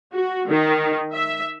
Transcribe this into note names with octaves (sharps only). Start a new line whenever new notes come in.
F#4
D#3
E5